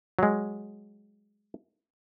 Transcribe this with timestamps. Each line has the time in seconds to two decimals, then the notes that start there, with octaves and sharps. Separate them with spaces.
0.19 F#3 G#3